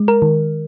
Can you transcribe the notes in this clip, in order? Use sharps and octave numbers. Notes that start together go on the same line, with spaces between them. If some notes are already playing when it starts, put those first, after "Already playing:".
Already playing: G#3
A#4
D#3